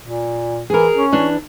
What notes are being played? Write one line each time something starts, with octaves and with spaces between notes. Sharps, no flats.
A#2
E3 G#4 A#4
C#4
E3 D4